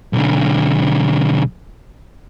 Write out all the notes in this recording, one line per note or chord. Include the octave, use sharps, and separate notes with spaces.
B1 D3